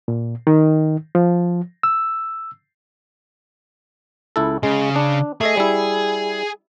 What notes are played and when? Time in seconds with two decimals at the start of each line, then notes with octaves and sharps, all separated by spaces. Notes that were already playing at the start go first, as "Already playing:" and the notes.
0.08 A#2
0.47 D#3
1.15 F3
1.83 E6
4.36 C#2 E4 A4
4.63 C#3 G#3
4.96 D4
5.41 A3 G#4 A4 D#5
5.57 G3 E4